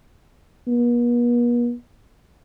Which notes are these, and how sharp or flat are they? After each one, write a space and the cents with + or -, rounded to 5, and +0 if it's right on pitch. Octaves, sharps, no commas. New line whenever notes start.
B3 -45